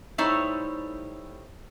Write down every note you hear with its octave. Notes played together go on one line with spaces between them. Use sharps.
G3 A3 D#4 E4 C5 C#5